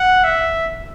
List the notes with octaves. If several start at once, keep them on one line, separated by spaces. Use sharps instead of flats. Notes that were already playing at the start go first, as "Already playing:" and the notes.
Already playing: F#5
E5